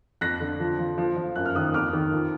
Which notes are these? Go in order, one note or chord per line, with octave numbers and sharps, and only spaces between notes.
F2 F#6 A#6
D3
F3
F3
F3
F3
F#2 F#6
F6
D#3 D#6 F#6
F2 D6 F6
D#3
F3